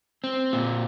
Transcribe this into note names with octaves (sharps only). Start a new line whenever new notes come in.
C4
A#2